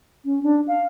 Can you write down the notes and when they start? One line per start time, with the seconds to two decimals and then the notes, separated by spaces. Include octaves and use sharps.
0.25 C#4
0.43 D4
0.68 F5